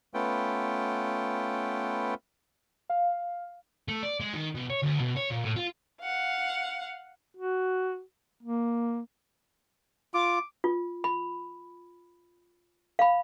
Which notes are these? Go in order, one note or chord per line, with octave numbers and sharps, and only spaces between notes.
A3 B3 C#4 F4 B4 G5
F5
A3
D5
G#3
D#3
B2
C#5
D2
B2
C#5
A#2
A2
F4
F5 F#5
F#4
A#3
F4 D6
F4
B5
F5 B5